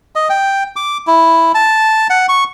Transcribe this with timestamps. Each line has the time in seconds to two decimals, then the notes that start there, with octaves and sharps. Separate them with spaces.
0.15 D#5
0.29 G5
0.76 D6
1.07 E4
1.55 A5
2.10 F#5
2.29 C#6